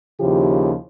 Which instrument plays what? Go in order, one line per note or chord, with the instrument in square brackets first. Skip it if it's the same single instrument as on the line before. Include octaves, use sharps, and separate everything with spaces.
[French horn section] D#2 C#3 F3 E4 F4 G4